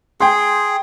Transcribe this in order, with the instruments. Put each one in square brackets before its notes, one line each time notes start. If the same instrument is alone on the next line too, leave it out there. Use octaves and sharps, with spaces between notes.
[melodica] G#4 [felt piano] G5 C6